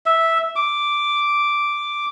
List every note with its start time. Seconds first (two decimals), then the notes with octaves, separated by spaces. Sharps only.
0.06 E5
0.56 D6